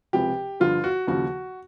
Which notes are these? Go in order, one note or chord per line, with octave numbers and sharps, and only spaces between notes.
C#2 C3 F3 G4
G2 D3 F3 F4
F#4
D#2 C#3 F3 F#4